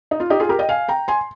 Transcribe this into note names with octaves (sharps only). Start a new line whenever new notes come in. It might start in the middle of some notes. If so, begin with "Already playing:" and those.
D#4
F4
D#4 G4
F4 G#4
G4 A#4
D#5 G5
F5 G#5
G5 A#5
G#5 C6